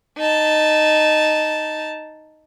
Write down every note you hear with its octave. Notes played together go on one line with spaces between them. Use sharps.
D#4 A5